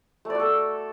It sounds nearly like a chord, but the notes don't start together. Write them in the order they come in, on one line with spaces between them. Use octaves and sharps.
A3 D5 F#4 A4